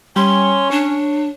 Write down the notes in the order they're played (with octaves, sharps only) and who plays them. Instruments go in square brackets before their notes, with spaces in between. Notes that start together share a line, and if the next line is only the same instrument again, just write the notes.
[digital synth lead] G3 [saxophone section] C#4 [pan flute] C6
[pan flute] D4 [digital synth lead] C#5